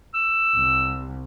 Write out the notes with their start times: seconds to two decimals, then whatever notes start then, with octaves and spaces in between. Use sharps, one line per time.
0.14 E6
0.55 C2